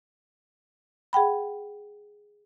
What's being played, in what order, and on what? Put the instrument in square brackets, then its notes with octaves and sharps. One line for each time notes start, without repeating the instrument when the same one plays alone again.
[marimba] G#4 F#5 G5 B5